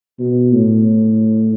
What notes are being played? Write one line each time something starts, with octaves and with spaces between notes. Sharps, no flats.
B2
A2